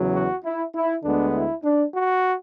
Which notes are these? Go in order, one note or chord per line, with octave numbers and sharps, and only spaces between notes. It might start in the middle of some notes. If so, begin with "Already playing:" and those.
Already playing: E2 C#3 F#3
F#4
E4
E4
D2 D3 G#3 B3 D4
E4
D4
F#4